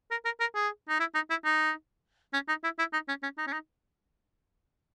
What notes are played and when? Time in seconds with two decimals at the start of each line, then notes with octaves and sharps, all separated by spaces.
0.11 A#4
0.25 A#4
0.40 A#4
0.55 G#4
0.89 D#4
1.00 E4
1.15 D#4
1.30 E4
1.45 D#4
2.33 C#4
2.48 D#4
2.64 E4
2.79 E4
2.93 D#4
3.08 C#4
3.23 C#4
3.38 D#4
3.47 C#4
3.53 D#4